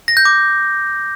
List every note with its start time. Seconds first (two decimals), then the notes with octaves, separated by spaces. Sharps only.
0.08 A#6
0.17 G6
0.25 D6